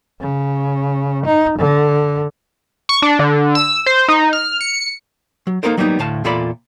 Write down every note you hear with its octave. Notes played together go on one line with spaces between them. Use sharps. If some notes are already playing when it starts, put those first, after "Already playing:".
C#3
D#4
D3
C#6
D4
D3
E6
C5
D#4
F6
C#7
F#3
A#3 C#4 D#4 A4 A#4 C5
F#3 G3 A#3 B3 C#4 D#4
D2 A2 F5 A5
E2 A#2 F4 A4 D5 B5